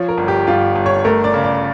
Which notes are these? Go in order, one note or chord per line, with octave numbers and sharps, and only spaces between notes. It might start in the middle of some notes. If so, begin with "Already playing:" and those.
Already playing: F3 C#5
A#4
G1
G4
G1 F4
G1
C#5
A3 A#4
D5
C#3
D5